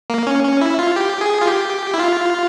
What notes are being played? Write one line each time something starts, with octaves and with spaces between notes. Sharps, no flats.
A#3
C#4
C#4
E4
F4
G4
G#4
F4
G4
E4
F4